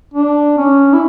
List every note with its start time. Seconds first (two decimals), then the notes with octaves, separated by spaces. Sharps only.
0.14 D4
0.58 C#4
0.93 E4